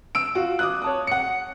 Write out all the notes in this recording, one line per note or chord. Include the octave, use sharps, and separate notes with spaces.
E6 D7
F4 F#4
D6 D#6 F#6
C#5 A5 D#6
F#5 C#7